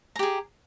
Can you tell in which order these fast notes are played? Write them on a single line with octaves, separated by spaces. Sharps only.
A#5 G4 G#4